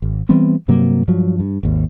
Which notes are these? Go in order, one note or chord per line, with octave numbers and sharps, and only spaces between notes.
G#1
E3 G3 B3 C4
G2 C3 F#3 A#3
G2 F3 F#3
G2
G#1 D#2